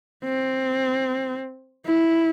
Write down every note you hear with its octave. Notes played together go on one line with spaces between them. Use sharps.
C4
E4